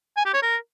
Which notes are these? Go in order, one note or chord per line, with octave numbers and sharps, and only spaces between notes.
G#5
G4
C#5
A#4